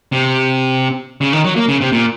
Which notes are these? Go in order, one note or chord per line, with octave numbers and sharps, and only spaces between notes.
C3
C#3
D#3
F#3
A#3
C#3
C3
A#2